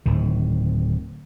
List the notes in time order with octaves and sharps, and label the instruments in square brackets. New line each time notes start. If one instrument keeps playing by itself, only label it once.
[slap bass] D1 D#3